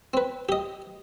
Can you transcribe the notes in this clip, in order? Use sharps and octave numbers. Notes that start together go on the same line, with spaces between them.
C4 B4
G4 D#5